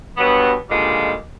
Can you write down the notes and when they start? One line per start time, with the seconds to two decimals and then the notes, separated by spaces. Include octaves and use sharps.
0.18 G2 B2 F#3 B3
0.70 A#2 D3 D#3 F3 G3 G#3